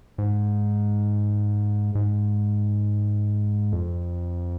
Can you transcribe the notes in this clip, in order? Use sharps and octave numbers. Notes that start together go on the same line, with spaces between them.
G#2
G#2
F2